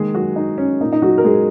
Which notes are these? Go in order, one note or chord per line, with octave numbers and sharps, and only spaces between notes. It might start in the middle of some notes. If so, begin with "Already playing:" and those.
Already playing: D#3 G#3 A#3 G#4
F#3 F#4
D#4
C#4
A#2 A#3 D#4
D#4
F#3 F#4
A#4
G#3 G#4